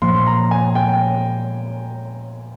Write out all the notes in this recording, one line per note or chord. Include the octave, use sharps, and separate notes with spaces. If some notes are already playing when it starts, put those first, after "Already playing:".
A#2 F3 A#3 C6
A#5
G#5
G5